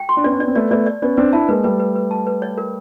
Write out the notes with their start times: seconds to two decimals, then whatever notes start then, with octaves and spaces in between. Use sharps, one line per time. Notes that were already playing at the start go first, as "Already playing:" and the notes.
Already playing: G5
0.09 C6
0.17 D4
0.24 B3 C#4 D5
0.33 D4
0.40 C#4 D5
0.48 C4
0.55 A3 B3 D5
0.71 A3 B3 D5
0.86 D5
1.02 B3 C#4 D5
1.17 C4 D4 B4
1.33 D4 E4 A5
1.48 G#3 A#3 B4
1.64 G3 A3 B4
1.80 B4
1.95 B4
2.11 A5
2.27 B4
2.42 C#5
2.58 A#4